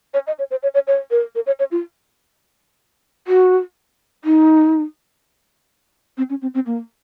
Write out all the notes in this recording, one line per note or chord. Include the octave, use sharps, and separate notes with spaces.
C#5
D#5
C#5
C5
C#5
C#5
C#5
A#4
A#4
C#5
C#5
F4
F#4
D#4
C4
C#4
C4
C4
A#3